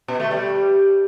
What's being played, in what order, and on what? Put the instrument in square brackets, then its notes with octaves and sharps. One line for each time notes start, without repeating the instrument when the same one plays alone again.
[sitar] B2
A3
G3